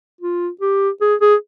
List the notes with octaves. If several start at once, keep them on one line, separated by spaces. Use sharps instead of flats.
F4
G4
G#4
G#4